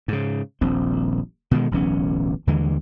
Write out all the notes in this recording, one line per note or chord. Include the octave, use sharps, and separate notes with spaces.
G#2 C#3
D#1 A#1 C4
B2 D3 D#3 G#3
D1 B1 E3 C#4
D#2 D3 E3 G#3